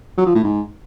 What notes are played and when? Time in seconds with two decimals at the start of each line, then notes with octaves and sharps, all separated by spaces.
0.18 F#3
0.26 F3
0.35 A2
0.44 G#2